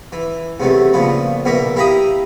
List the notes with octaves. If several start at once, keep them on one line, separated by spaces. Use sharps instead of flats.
E3
E2 C3 F#3 A3
A#2 C#3 F3 B3
A#1 B2 A#3 A#4 E5 D6
E4 G4 F5 A#5 B5 D#6